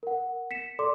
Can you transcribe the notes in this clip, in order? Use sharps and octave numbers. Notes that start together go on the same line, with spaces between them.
A#4 F#5
B6 C#7 E7
A4 D5 C6 D6